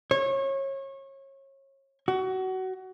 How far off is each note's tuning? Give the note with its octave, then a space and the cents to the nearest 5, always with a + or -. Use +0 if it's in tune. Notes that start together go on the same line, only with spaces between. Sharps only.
C#5 -30
F#4 +25